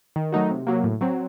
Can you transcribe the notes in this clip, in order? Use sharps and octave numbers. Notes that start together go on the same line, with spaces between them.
D#3
F#3 A3 D#4 F#4
C3
F#3 A#3
A2
F#3 C4